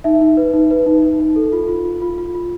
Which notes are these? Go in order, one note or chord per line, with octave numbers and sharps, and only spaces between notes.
D#4 E5
D#4
B4
D#4
B4
D#4
D#4
D#4
A4
F4
F4
F4
F4
F4
F4